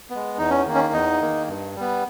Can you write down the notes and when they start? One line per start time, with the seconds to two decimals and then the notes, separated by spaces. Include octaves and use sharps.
0.10 B3
0.15 G#3
0.38 E2 D#4
0.50 C#4
0.66 D#3 A#3
0.74 C#4
0.93 E2 D#4
1.21 D#3 A#3
1.48 G2
1.76 G3 B3